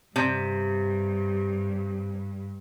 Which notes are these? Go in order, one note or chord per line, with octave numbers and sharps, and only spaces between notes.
G2 C3